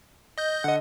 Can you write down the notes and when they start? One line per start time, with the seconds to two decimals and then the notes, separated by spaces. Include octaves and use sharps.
0.38 D#5 G6
0.64 D3 D#5 F#5